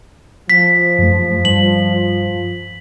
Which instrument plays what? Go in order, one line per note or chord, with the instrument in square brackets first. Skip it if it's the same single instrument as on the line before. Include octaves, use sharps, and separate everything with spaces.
[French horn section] F3 [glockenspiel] B6
[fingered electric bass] F#2 A3
[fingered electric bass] G2 [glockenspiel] F#7